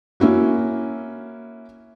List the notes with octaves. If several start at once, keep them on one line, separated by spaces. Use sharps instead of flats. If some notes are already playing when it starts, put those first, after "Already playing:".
A#3 C#4 E4 F#4